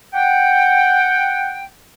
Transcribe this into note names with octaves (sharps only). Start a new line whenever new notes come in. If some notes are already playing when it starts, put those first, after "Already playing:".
F#5 G5